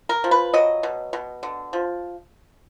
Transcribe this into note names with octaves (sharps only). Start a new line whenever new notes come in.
A#4
F3
B4
F#3 D#5
B2
B2
D3
F3